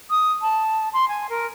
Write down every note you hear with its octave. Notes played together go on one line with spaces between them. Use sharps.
D#6
A5
C6
G#5
A#4